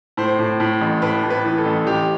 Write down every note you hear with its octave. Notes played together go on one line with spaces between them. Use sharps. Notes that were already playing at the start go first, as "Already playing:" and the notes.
A2 C5
A2
A2
A1
A2 B4
A2
B4
E3
A4
A1
A1 G4